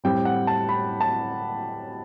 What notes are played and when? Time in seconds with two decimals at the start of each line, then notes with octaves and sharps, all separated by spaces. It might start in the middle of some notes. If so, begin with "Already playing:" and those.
0.04 A2 G3 C4 G5
0.25 F#5
0.47 A5
0.69 B5
1.01 A5